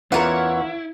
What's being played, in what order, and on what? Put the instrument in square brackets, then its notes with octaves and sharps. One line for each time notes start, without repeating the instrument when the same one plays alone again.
[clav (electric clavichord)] E2 E3 [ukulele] C#4 F4 A#4 [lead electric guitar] E4 [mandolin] C#5 F#5